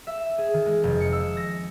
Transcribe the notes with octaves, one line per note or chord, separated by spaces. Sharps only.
E5
G#4
D#3
G#3
F1
C#7
E6
A#6